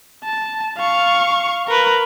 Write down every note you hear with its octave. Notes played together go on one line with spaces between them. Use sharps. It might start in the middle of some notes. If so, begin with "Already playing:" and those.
A5
F5 C#6
A#4 B4